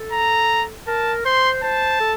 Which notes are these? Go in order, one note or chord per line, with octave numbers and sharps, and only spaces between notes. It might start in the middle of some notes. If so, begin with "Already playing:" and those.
Already playing: A4
A#5
A#4 A5
C5 C6
C5 A5
A4